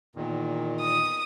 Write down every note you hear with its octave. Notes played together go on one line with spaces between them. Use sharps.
E2 A#2 D#3
D#6